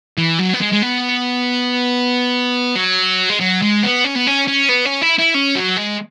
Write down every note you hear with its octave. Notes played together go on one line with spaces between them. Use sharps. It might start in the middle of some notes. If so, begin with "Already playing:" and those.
E3
F#3
B3
G#3
G#3
B3
F#3
G#3
F#3
G#3
B3
C#4
B3
C#4
C#4
B3
C#4
E4
E4
C#4
F#3
G#3